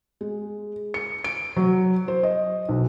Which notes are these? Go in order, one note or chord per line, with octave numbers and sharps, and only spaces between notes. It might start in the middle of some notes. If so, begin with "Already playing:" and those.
G#3
C#7
D7
F#3
C5
D#5
B1